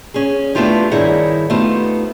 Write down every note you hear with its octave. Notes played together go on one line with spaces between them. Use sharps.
C#4 G#4
A3 B3 D4 E4 F4 G4
G2 D#3 E4 G#4 C#5 F#5
A3 B3 D#4 F4 G4 C5